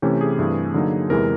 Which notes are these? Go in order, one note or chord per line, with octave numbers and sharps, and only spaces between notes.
C3 E3 A3 C#4 G4
G#4
G2 E3 A3 C4
D3 F#3 A#3 D#4
E2 C3 E3 G#3 A#4